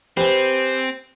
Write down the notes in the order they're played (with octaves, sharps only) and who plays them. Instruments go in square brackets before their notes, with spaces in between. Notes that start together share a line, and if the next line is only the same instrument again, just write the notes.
[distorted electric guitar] C4 [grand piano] G4 B4 [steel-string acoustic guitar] C5 G5 G#5